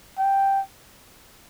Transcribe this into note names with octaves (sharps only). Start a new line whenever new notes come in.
G5